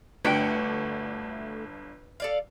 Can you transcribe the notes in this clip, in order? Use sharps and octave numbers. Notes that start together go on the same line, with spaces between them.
G1 A3 D4 F#4 B4 G5 C#7
A4 D5 F5